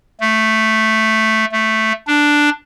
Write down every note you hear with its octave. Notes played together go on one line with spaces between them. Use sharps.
A3
A3
D4